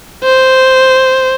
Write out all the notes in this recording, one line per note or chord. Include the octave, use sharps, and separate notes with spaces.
C5